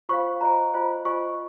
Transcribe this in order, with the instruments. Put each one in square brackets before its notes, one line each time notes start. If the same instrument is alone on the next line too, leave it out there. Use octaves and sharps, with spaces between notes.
[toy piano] F4 C5 F5 [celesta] C#6
[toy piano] F4 C5 D#5 G#5 [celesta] A#5
[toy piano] F4 C5 D#5 G#5
[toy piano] F4 C5 D#5 G#5 [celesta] C#6